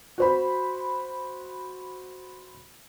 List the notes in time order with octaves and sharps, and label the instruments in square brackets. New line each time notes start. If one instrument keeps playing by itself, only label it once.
[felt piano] F#4 C5 B5